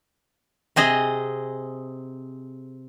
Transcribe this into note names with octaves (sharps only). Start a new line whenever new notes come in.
C3 C4 G#4 D#5